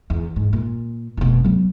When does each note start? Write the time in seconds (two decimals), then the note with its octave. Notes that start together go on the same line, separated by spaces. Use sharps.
0.10 E2
0.36 G#2
0.53 A#2
1.17 F1 B2
1.44 F#3 B3